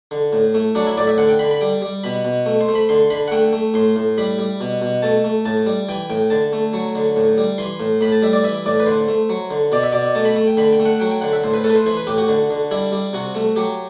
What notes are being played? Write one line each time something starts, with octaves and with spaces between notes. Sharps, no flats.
D3
A2
A3
F#3 D4
E4
A2 D5
E5
D3 F#5
G5
D3 B5
B5
G3 G5
G3
B2 B5
B2
A3
C5
A3
B5
D3 C6
D3 B5
F#5
A3 G5
A3
A2 C6
A2
G3 B5
G3
B2
B2
A3 A5
A3
A2 A5
G3
E3 G5
A2 G5
D3 A5
A3
F#3
D3
A2
G3
E3 C6
A2
A2 B5
A5
G3 E5
D5
E3 E5
A2 D5
B4
D3 C5
A3
F#3
D3
B2 D5
E5
B2 D5
A3 A5
B5
A3
G5
D3 B5
G5
A3
F#5
F#3 G5
G5
D3 F#5
E5
A2 C5
B4
A3 A4
B4
C5
E3 C5
B4
A2 G4
F#4
D3
D3
G3 E4
G3
C3 F#4
A3
F#3 G4